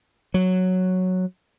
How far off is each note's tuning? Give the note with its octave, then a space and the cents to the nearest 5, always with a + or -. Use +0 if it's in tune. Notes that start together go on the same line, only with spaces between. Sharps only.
F#3 -5